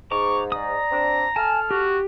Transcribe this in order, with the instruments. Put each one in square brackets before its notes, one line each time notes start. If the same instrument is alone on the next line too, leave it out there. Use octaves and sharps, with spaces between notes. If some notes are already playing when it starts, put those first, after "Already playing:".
[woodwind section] G#2 [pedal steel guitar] A#5 D6 [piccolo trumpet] C#6
[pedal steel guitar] D5 D#6 [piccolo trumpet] A#5
[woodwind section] C4 D4
[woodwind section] A4 F6 [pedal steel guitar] G#5 A5
[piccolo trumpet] F#4 [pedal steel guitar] G4